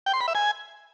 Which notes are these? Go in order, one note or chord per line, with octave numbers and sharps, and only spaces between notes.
G5
C6
B5
E5
G#5